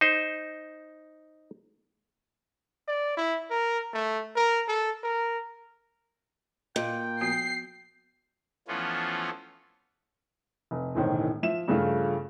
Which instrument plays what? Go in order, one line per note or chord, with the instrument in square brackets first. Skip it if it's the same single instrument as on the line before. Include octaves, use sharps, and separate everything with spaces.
[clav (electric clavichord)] D#4 C5
[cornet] D5
E4
A#4
A3
A#4
A4
A#4
[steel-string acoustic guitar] A#2 [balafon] D#5 F5 [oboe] G5
[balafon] F3 B3 F#4 [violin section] C7
[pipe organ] E3 F3 A3 B3 C#4 F4
[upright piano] F1
E1 C2 A2 D#3 C#4 C5
F3 E5 E7
G2 C#3 F3 A3 F4